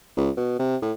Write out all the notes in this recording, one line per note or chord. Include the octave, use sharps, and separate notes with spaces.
C#2
B2
C3
A2